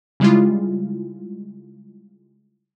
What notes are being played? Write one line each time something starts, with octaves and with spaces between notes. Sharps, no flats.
C#3 G3 G#3 E4 F4